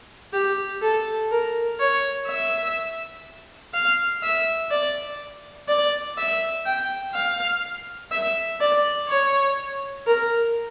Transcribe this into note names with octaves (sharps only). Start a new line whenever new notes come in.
G4
A4
A#4
C#5
E5
F5
E5
D5
D5
E5
G5
F5
E5
D5
C#5
A#4